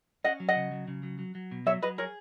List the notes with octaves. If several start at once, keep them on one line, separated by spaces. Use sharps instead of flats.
C#4 D#5 F#5
F#3
D#5 F#5
C#3
F#3
C#3
F#3
F#3
F#3
B2
F#3 C#5 E5
F#3 B4 D#5
G#4 A#4 C#5